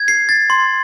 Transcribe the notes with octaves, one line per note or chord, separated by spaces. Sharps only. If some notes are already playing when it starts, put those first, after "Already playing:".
Already playing: G#6
C7
A6
C6